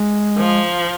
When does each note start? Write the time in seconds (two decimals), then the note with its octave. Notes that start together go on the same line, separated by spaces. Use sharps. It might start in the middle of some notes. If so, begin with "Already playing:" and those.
Already playing: G#3
0.38 F3